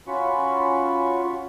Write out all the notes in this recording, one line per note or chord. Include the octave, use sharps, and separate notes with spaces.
C#4 F4 F#4 B5 C#6